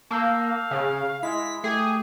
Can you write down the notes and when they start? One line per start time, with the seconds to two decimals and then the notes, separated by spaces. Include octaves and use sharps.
0.11 A#3 A5 E6 G6
0.41 F5
0.71 C#3
1.23 G#3 E4 B6
1.64 A3 G4 G#4